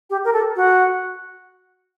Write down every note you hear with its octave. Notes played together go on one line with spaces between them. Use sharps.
G4
A#4
A4
F#4